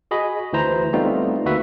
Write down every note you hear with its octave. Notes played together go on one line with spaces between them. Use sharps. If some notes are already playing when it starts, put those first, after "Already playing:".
F#4 G#4 D#5 B5
D2 E3 E4 C5 A#5
G3 A3 B3 C4 D#4 F4
D2 A#3 F#4 B4 E5